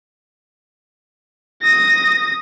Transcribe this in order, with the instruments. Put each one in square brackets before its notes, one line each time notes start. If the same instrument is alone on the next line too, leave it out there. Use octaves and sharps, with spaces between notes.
[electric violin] D#6 A#6